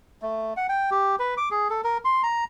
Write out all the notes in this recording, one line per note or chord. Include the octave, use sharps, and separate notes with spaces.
A3
F#5
G5
G4
B4
D6
G#4
A4
A#4
C6
A#5